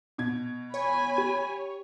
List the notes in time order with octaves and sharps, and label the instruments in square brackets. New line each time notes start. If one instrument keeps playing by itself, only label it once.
[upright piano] B2 G#6
[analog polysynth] C#5 [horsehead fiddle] G#5 B5
[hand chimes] G4